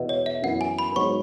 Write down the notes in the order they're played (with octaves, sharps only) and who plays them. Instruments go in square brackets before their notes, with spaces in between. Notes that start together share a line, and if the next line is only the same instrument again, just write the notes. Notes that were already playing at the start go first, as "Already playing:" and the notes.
Already playing: [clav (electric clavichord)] E2 B2 B3 E4
[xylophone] C#5
E5
[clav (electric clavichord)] F#2 E3 B3 E4 [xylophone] F#5
[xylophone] G#5
B5
[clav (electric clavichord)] G#2 F#3 B3 [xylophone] C#6